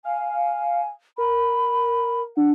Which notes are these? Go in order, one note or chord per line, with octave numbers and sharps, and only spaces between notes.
F5 G#5
A#4 B5
D4 F#5